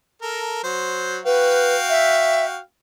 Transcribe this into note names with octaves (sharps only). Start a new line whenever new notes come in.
A4 A#4
F#3 C5
F#4 B4 F5 G5
E5